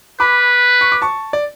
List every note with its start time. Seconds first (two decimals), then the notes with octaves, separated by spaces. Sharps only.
0.20 B4 B5 D6
0.81 C#6
0.92 D6
1.02 A5 C#6
1.33 D5